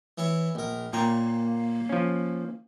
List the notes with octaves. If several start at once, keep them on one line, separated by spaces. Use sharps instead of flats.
E3 E4 C#5
A#1 A#4
A#2 A#3 C#5 G5 A#5
F3 C#4